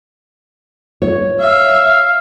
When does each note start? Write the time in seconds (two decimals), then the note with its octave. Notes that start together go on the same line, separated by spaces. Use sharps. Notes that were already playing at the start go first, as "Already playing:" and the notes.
1.02 C#5
1.40 E5 F5